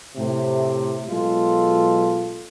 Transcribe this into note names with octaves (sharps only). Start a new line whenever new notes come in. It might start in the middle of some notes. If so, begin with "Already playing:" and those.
A2 C3
B2 F#3 G#3 F4 A4